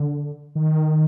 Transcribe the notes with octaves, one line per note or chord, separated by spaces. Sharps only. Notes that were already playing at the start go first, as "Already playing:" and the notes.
Already playing: D3
D#3